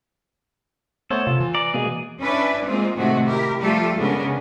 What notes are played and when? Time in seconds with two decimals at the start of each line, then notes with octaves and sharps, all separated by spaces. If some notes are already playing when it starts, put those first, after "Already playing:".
1.10 A3 B3 A4 C5 C#5
1.27 C3 F4
1.40 E3
1.55 D5 A#5
1.74 B2 G#3 A#3 G#4
2.20 C#4 D4 E4 B4 D5
2.65 G#3 A#3 C4 F4
2.96 A2 C3 D#3 G#3 A3 F#4
3.25 E4 G4 A#4
3.61 F3 G3 A3 F4 G4 A4
3.97 C#3 G#3 B3 C#4 D4 A#4